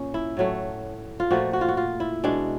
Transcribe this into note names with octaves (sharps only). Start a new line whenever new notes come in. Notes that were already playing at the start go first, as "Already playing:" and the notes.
Already playing: A#2 C#4
E4
A2 F#3 A3
F4
A#2 F3 A3 F#4
F#4
F4
F#4
F4
E4
B2 G#3 D4